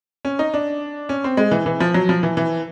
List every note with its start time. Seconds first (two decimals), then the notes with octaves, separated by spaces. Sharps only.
0.25 C#4
0.39 D#4
0.54 D4
1.09 C#4
1.24 C4
1.37 G#3
1.51 E3
1.66 E3
1.80 F3
1.94 F#3
2.09 F3
2.23 E3
2.37 E3